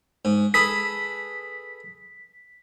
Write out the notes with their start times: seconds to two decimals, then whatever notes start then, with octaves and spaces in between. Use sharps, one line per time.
0.25 G#2
0.54 G#4 A4 B4 B6